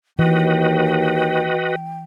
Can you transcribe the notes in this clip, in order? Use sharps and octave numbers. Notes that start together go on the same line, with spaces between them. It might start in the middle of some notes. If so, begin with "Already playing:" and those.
D#2 E3 F#4 B4 D#5 G5